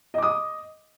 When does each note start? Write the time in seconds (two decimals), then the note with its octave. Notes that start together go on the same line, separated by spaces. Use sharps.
0.14 D#5
0.18 D6
0.23 D#6